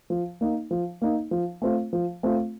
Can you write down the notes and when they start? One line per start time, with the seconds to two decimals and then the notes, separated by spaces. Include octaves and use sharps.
0.10 F3
0.41 A#3 D#4
0.71 F3
1.02 A#3 D#4
1.31 F3
1.62 A3 C4 F4
1.93 F3
2.23 A3 C4 F4